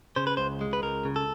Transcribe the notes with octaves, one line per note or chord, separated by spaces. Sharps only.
C#3 C5
B4
C#2 C5
G#3
B4
C#2 A#4
C#3
A4